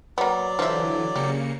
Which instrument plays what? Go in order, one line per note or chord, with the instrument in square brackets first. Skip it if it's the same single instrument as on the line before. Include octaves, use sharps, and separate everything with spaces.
[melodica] F#3 D5 [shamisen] A#3 B3
[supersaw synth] D3 E3 [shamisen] F3 E5
[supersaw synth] C#3 A#3 C#7 [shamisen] G4